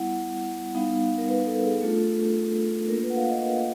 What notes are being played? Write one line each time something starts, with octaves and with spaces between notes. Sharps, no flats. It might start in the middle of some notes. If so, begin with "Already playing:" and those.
Already playing: G3 B3 E4 F#5
G3 B3 D#4 F5
A#4
B4
A4
G#4
A3 D4 F4 A4
A#3 D4 F4 A#4
B4
F#5
F5
D#5